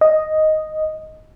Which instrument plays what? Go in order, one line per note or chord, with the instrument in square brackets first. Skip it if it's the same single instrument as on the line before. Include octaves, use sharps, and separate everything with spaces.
[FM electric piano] D#5